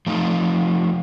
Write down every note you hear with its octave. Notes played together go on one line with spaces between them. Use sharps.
F3 A3 D#4